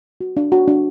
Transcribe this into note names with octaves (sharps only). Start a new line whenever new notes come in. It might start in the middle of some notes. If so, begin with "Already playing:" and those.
F#4
D4
F#4
D4